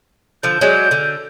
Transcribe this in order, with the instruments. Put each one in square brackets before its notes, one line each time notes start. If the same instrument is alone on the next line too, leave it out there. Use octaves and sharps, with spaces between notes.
[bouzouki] D3 F3 [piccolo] G6
[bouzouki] F#3 G#3 D4
D3